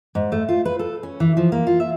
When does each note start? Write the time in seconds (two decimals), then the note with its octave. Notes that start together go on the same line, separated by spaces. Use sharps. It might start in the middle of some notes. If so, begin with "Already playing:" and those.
0.15 G#2
0.32 A3
0.49 F4
0.65 B4
0.79 A4
1.03 C#4
1.20 E3
1.37 F3
1.52 A#3
1.67 F4
1.80 E5